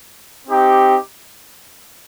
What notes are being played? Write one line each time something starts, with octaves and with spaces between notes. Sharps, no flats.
C4 D#4 G4